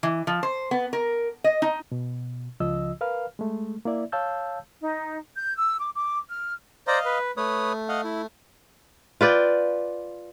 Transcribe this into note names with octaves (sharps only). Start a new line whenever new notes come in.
E3
F3
C5
B3
A#4
D#5
D#4
B2
C#2 C#3 F3 F4 D#5 E6
A#4 B4 F5 F6
G#3 A3
A#3 E4 D5 E5
C#5 F5 A5 E6 G6
D#4
G6
E6
D6
D6
F6
C5 D5 D#5 F5 A#5
B4
A3 B4 C#5 D#6
D#5 F5 F#5
E4
F4 B4 D5 G5